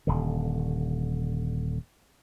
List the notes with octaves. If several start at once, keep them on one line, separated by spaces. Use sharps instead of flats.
D#1 D3